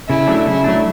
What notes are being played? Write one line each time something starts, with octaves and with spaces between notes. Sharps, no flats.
C#3 E4
F#3 A3 D4
C#3 E4
F#3 A3 D4